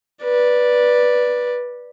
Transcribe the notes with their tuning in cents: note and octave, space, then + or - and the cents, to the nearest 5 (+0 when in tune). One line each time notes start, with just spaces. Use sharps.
B4 -15 D5 +0